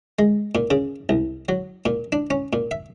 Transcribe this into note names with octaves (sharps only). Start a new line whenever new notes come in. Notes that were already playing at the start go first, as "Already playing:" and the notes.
G#3
A#2
C#3
C2
F#3
A#2
D4
C#4
A#2
E5